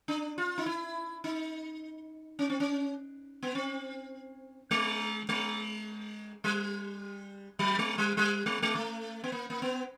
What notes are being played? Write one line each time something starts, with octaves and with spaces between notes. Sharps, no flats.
D4
F4
D#4
E4
D#4
C#4
C4
C#4
B3
C4
G#3
G#3
G3
F#3
G#3
G3
G3
G#3
G#3
A3
B3
A#3
A#3
B3